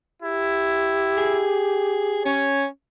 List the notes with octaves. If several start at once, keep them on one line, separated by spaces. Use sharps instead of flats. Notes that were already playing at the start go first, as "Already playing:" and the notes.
E4 G4
G#4
C#4 C#5